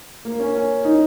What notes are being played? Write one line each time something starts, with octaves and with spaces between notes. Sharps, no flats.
A#3
C#4
C#4
D#4